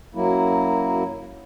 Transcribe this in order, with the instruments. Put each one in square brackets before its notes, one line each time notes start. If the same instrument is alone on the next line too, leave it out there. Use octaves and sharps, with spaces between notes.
[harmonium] F#2 F#3 A#3 E4